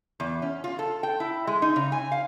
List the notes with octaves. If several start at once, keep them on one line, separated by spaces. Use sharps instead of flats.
E2
C#4
F4
A4
G5
E4
G#3
D#4
C#3
G#5
F5